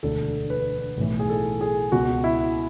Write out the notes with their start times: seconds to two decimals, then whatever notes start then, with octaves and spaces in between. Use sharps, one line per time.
0.03 E1 D2 D3 A4
0.50 B4
0.97 B1 A2 E3
1.19 G#4
1.29 A4
1.61 G#4
1.92 C#2 B2 F#4
2.24 E4